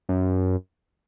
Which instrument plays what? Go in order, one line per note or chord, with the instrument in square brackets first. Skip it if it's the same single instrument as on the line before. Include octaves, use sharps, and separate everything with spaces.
[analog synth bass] F#2